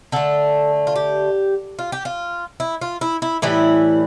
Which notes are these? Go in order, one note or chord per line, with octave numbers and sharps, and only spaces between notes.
D3 A3 A4
F4
G4
F4
G4
F4
E4
F4
E4
E4
A2 E3 G3 E4